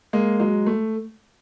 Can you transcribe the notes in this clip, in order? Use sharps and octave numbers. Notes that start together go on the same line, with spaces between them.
G#3 A#3
F#3 G#3
A3